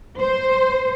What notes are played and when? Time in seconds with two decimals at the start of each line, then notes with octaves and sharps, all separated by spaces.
0.20 C5